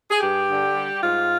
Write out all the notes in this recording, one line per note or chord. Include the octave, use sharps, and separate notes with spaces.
G#4
G2 G4
D3
G3
G#2 F4